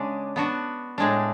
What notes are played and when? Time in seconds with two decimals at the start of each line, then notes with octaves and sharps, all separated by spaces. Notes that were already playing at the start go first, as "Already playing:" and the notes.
Already playing: C#3 G#3 D4
0.36 B3 D4 F#4
0.98 A2 G#3 D4